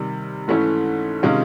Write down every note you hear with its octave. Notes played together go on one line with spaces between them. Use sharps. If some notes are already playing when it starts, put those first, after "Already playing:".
Already playing: C3 D#3 G3
G#2 E3 A3 C#4 E4
C3 D#3 G#3 C#4 F4